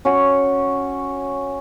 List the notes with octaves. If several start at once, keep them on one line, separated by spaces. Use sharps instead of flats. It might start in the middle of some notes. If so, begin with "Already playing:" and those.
C#4 F#4